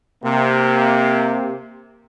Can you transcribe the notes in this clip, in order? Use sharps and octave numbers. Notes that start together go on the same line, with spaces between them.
C3 A#3